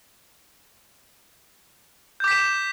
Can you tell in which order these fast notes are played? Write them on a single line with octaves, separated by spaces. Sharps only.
G6 D6 B6 E7